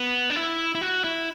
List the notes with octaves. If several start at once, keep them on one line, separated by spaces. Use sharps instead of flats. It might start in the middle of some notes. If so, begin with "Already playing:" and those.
Already playing: B3
D4
E4
E4
F#4
E4